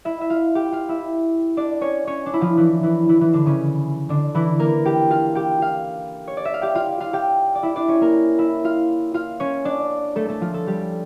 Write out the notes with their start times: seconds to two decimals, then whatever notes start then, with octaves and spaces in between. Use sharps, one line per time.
0.05 E4 E5
0.21 E5
0.30 F4 F5
0.55 G4 G5
0.72 F4 F5
0.89 E4 E5
1.57 D4 D5
1.81 C#4 C#5
2.07 C#4 C#5
2.26 D4
2.34 E4
2.41 F3 F4
2.57 E3 E4
2.83 E3 E4
3.09 E3 E4
3.21 E3 E4
3.33 D3 D4
3.46 C#3 C#4
4.09 D3 D4
4.35 E3 E4
4.59 A#3 A#4
4.85 G4 G5
5.10 F4 F5
5.35 G4 G5
5.61 F4 F5
6.27 C#5
6.37 D5
6.45 E5
6.54 F5
6.62 G4 G5
6.75 F4 F5
7.00 F4 F5
7.13 G4 G5
7.55 D5
7.63 E4 E5
7.76 D4 D5
7.88 C#4 C#5
8.01 A#3 A#4
8.38 E4 E5
8.64 F4 F5
9.14 F4 F5
9.40 C#4 C#5
9.65 D4 D5
10.16 A3 A4
10.28 A3 A4
10.41 F3 F4
10.53 A3 A4
10.67 G3 G4